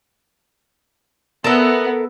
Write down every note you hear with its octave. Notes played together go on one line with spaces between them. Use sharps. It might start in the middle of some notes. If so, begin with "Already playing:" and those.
B3 A4 A#4 E5